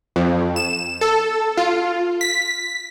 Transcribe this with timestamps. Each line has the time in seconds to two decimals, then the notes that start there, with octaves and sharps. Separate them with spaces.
0.16 F2
0.56 E7
1.01 A4
1.58 F4
2.21 B6